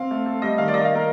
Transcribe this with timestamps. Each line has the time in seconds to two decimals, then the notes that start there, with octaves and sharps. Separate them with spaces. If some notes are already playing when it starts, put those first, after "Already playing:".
Already playing: C4 F5
0.11 A3
0.26 A3
0.42 G3 D#5
0.58 D#3 F5
0.68 D5
0.74 D#3 D#5
0.85 F5
0.90 A#3 A#4